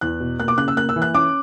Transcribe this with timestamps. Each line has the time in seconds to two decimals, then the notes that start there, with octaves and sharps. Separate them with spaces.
0.01 E2 F#6
0.20 B2
0.40 A#3 F#6
0.48 D6
0.58 C#3 F#6
0.68 E6
0.77 A#3 F#6
0.89 E6
0.96 E3
1.02 F#6
1.14 C#4 D6